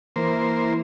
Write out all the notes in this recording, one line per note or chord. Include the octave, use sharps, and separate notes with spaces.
E3 A#3 E4 C5